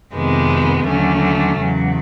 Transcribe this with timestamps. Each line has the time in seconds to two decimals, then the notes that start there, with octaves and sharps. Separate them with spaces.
0.14 F2 C3 D#3 G#3 B3
0.87 D#2 D3 F#3 A3 C#4
1.59 E2 C#3 F#3